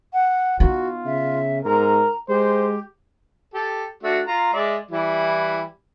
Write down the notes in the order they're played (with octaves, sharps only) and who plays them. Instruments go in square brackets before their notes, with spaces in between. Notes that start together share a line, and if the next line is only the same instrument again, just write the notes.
[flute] F#5
[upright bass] B3 D#4 [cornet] F4 [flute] F#4
[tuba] C#3 [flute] E5
[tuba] G#2 [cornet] A#4 [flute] A#5
[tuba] G#3 [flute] G4 [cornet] C5
[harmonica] G4 A4
A3 D4 F#4
F4 A#5
G#3 D5 E5
E3 G3 E4